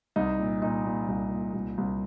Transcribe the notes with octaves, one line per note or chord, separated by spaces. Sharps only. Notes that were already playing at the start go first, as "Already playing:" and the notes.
C2 D#4
A#2
A#2 D#4
A#2
C2
A#2
C2
C2